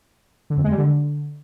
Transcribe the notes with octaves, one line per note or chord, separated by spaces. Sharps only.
D3
F2
G#3
G3
D3